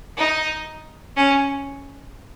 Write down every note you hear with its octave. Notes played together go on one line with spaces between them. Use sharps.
D#4
C#4